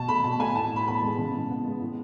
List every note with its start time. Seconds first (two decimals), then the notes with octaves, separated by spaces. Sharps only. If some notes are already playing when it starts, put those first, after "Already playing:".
Already playing: B2 A5
0.09 A3 B5
0.24 B2 A5
0.40 A3 G#5
0.55 A2 A5
0.71 A2 B5
0.87 B3 B5
0.97 G#3 A5
1.18 C#3
1.33 C#3
1.50 B3
1.64 G#3
1.81 A2